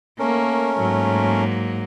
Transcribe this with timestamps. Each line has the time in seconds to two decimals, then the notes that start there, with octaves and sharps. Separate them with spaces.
0.19 A3 A#3 C#4 A#4
0.79 G#2 F#3 A#3